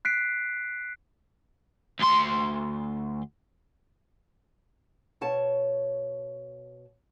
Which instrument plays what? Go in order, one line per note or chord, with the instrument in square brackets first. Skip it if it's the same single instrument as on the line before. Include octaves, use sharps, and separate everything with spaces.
[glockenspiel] F#6 B6 C7 D7
[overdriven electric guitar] D2 C6
[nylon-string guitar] B2 C#5 A5